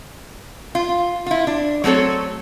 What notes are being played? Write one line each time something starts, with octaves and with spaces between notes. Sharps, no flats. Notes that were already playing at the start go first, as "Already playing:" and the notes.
F4
E4 F4
D4
F#3 A3 C4 A4 C#5